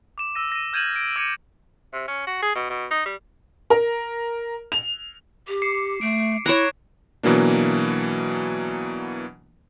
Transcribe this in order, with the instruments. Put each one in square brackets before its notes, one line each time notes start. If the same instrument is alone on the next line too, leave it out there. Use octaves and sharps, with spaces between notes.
[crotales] D6 E7
E6 A#6 D#7
A#6 D#7
F6 G6 G#6 D#7 E7 F#7
D7
D6 E6 G#6 A#6 C#7 D#7
[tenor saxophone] C3
C#4
F#4
G#4
B2
B2
D#4
G3
[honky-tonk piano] A#4
F7
[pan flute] G4
[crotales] D6 C7 C#7
[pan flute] A3 [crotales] D7
[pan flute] E4 [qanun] C#5 A#5 [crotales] F#6 D7 E7
[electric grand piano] B2 E3 F#3 A#3 D4